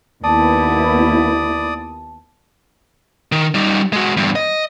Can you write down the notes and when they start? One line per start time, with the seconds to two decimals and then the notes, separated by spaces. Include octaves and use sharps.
0.24 D#2 B3 E4 D5 A5 D#6
3.32 D#3
3.54 G3 D#4
3.93 G#3 F#4
4.17 E2 G2
4.36 D#5